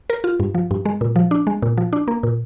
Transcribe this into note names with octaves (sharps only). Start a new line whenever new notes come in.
A#4
F4
G2
F3
G2
G#3
A#2
F3
D4
G#3
A#2
F3
D4
A#3
A#2